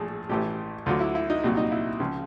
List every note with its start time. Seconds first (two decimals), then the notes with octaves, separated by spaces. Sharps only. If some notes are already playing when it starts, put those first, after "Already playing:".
Already playing: A#1 A2 F3 G#4 A4
0.29 A1 A2 E3 G4
0.86 D2 D3 F#3 F4
1.00 E4
1.15 E4
1.30 D#4
1.44 C2 A#2 F#3
1.57 D#4
1.72 E4
2.00 C#2 C#3 F3